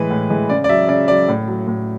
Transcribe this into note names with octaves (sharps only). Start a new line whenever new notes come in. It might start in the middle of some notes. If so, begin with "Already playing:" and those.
Already playing: A2 E3 G#3 B4
A2
E3 G#3
C#3 D5
D5
F#3 E5
C#3 D5
F#3 D5
A2
F#3
A2